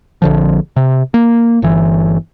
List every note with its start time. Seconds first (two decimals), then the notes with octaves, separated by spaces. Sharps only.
0.22 A#1 D3 F3
0.76 C3
1.14 A#3
1.62 G1 E3